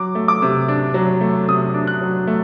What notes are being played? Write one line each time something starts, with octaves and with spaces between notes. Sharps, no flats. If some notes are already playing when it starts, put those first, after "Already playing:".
Already playing: F#3 D6
A3
D6
C3
D4
F#3
A3
C3 D#6
D4
F#6
F#3
A3